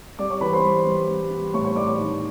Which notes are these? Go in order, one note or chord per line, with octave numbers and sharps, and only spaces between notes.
G3 D5 D6
C#5 C#6
E3 B4 B5
C5 C6
G3
G3
G3
G3
A2 C#5 C#6
C#5 C#6
A2 D5 D6
C#5 C#6
D#3